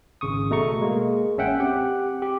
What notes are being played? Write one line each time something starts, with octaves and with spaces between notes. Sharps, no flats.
G#1 C#3 C#6 D#6
B2 A3 A#5 C#6
G#3 A#3
A1 C#4 E5 F#5 G5
C4 G4 F#5
G4